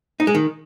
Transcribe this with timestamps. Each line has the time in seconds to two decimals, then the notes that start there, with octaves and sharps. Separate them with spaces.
0.20 D#4
0.27 G#3
0.35 D#3